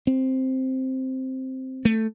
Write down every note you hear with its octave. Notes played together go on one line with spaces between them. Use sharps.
C4
A3